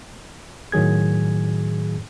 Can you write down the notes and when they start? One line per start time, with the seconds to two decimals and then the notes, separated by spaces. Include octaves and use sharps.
0.72 A2 D#3 F#3 G#4 G#6